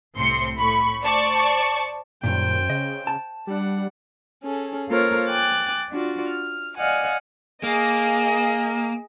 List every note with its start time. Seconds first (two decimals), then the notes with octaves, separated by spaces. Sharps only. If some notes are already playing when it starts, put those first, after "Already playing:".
0.17 C2 A2 C4 C6 C#7
0.59 A2 A3 B5 C#6
1.04 C5 D5 A5 C#6
2.24 F#2 A#2 D#3 G3 C5 G5
2.70 C#3 D#5
3.07 A5
3.47 G3 D4 F#5
4.42 C#4 G#4 A4
4.89 A#3 F4 A4 A#4 C5 C#5
5.28 G5 G#5 D6 F#6 A6
5.91 D4 F4 F#4 D5
6.28 F6
6.77 D5 D#5 F5 F#5 G#5
7.63 A#3 G#4 D#5